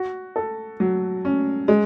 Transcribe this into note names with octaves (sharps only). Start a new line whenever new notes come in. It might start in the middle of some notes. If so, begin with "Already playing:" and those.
Already playing: F#4
A4
F#3
C#4
G#3